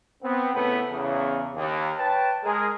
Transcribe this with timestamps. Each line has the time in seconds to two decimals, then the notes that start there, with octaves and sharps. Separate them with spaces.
0.23 B3 C4
0.54 A2 C#3 A3 B3
0.91 E2 C#3
1.56 D#2
1.97 B4 C#5 G5 A5
2.44 G#3 G#4 A#4